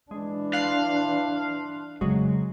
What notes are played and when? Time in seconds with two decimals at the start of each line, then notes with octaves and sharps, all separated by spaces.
0.11 E3 G#3 D4
0.53 F5 C6 F#6
2.01 F2 C#3 F#3 G#3